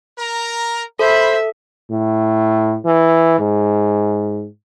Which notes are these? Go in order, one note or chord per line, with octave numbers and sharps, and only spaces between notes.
A#4 A#5
A4 C5 E5 B5
A2
E3
G#2